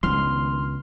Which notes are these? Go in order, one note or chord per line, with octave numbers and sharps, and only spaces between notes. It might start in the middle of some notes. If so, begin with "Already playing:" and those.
C#2 D#3 B3 D4 C6 F6